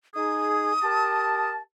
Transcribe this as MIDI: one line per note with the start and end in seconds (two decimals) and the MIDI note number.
0.15 0.73 63
0.15 0.73 68
0.15 1.50 87
0.83 1.59 67
0.83 1.59 70
0.83 1.59 81